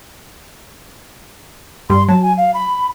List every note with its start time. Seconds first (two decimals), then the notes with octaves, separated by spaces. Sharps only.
1.90 G2 C6
2.08 F#3 A5
2.23 G#5
2.37 F5
2.54 B5